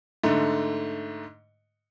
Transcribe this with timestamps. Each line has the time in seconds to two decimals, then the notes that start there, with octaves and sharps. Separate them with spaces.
0.23 G#2 D3 A3